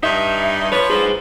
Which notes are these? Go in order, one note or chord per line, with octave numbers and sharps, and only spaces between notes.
G2 D#4 E5
F3 B4 C#5
G#4 C5